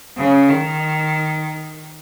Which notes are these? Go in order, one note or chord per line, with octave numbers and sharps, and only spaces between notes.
C#3
D#3